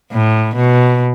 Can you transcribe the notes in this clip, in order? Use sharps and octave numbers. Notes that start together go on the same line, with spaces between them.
A2
B2